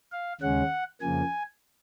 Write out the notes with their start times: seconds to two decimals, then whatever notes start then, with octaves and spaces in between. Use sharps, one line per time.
0.12 F5
0.41 D#2 C#3 G#3 C#4 F#5
1.01 F2 C#3 F3 A#3 G#5